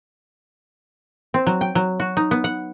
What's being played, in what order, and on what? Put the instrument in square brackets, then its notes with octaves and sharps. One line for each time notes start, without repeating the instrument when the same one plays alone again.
[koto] C4
F#3
G5
F#3
F#4
D#4
B3
F#5